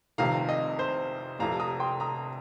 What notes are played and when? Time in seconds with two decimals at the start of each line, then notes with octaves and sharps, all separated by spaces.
0.18 F1 F2 C3 D#3 F5 A#5
0.49 D#5
0.79 C5
1.39 F1 F2 C3 F5 A#5
1.60 A#5 D#6
1.80 G5 C6
2.00 A#5 D#6